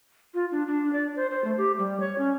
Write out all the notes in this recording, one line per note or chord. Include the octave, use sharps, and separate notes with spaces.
F4
D4
D4
D5
C5
C5
A3
G4
G3
C#5
C#4